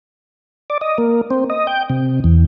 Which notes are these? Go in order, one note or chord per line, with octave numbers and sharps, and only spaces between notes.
D5
D#5
A#3
C4
D#5
G5
C3
E2